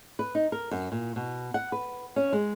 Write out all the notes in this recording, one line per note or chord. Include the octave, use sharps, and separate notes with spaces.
B4
D#4
A#4
F#2
A#2
B2
F#5
B4
C#4
G#3